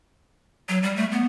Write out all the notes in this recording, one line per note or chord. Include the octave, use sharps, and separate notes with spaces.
F#3
G3
A3
B3